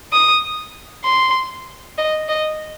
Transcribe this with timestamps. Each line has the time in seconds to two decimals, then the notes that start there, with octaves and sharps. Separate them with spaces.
0.13 D#6
1.05 C6
1.98 D#5
2.29 D#5